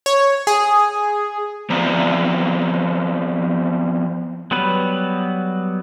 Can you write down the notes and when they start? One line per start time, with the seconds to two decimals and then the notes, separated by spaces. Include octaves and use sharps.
0.06 C#5
0.47 G#4
1.70 F3 B3 C4 D5 A#5
4.51 F#3 G3 B3 B4